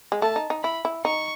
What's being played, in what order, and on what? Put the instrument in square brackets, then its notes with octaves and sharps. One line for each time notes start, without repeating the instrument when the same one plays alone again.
[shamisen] G#3
[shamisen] A3 [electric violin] A5
[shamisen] D#4
D#4
[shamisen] E4 [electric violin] B5
[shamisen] E4
[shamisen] D#4 [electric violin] C#6